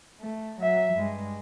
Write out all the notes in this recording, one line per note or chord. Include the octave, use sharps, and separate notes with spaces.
A3
F#3 E5
G2 G#3